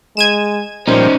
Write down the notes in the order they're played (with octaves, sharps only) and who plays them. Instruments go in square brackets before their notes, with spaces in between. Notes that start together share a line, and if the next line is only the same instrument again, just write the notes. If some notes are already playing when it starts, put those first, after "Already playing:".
[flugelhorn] G#3 [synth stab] G#6 D#7 E7
[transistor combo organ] A#2 F3 G3 [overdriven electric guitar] C#4 D#4 [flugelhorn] C5